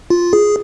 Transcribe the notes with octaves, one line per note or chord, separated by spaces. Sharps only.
F4
G#4